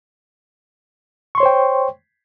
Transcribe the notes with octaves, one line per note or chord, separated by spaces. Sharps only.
C5 C#5 G5 C6 C#6